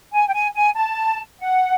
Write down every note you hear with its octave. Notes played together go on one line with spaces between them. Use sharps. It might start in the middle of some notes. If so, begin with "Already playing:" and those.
G#5
G5
G#5
G#5
A5
F#5